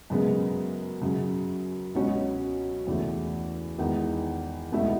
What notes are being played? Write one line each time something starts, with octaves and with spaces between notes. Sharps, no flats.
F#2 C#3 G#3 B3
F#2 C#3 F#3
C#2 B2 F#3 C#4
E2 C#3 E3 A3
E2 D#3 G#3 B3
C#2 B2 A3 E4